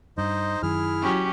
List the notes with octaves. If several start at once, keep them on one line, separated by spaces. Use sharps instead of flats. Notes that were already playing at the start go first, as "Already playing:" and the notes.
G2 D#4 C5 D#5
F#2 D#3 E4 G#4 F6
F#3 C#4 G4